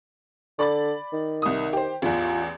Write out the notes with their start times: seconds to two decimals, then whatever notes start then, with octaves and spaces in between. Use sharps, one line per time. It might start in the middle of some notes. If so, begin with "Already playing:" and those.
0.59 D3 D5 B5 A6
1.13 D#3
1.42 C2 D#6
1.73 G4 C5
2.02 A1 E2 F4